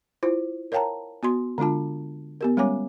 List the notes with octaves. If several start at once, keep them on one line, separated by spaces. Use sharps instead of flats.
E4 F4 C5
A#4 C#5 F5 G5 A5 A#5
B3 F#4 C6
D3 G#3 D4 F4 A5
B3 G4 A#4
G3 G#3 C#4 C#5 G#5 D6